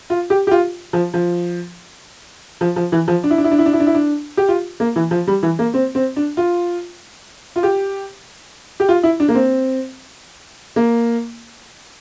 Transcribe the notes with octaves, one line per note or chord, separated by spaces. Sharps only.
F4
G4
G4
F4
F3
F3
F3
F3
E3
F3
D4
E4
D4
E4
D4
E4
D4
E4
D4
E4
D4
G4
F4
A#3
E3
F3
G3
E3
A#3
C4
C4
D4
F4
F4
G4
G4
F4
E4
D4
A#3
C4
A#3